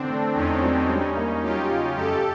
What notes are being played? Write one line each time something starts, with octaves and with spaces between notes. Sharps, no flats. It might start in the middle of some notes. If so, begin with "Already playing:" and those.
Already playing: D3 E3 C4 D4
A3
E2 C#4 D#4
F#3
G3
A#3
F#3 F4 G4
C#3
F#2 G4 A4